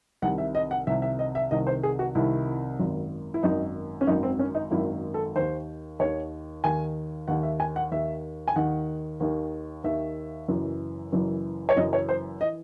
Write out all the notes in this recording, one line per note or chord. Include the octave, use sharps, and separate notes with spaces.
C2 C3 D#3 F#5
E5
D#5
F#5
C2 C3 D#3 E5
E5
D#5
E5
C2 C3 D#3 D#5
C5
G#4
F#4
C2 C3 D#3 E4
G#1 F#2 D#3
E4
G#1 F#2 D#3 D#4
C#4
G#1 F#2 D#3 D#4
C4
C#4
D#4
G#1 F#2 D#3 E4
A4
D#2 D#3 C5
D#2 D#3 C#5
D#2 D#3 G#5
D#2 D#3 F#5
E5
G#5
F#5
D#2 D#3 E5
G#5
D#2 D#3 F#5
D#2 D#3
D#2 D#3 E5
F#1 F#2 E3
F#1 F#2 E3
C#5
F#1 F#2 E3 D#5
C#5
C5
E3 D#5